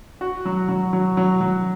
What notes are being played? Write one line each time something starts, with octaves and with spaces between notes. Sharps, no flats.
F#4
F#3
F#3
F#3
F#3
F#3